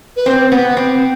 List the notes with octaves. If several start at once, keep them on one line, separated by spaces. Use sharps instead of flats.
B4
C4 C5
B3 B4
C4